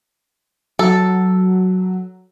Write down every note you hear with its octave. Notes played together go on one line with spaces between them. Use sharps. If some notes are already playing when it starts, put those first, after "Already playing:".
F#3 A4